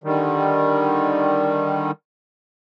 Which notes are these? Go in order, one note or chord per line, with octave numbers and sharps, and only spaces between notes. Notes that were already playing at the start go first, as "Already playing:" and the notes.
D3 D#3 G3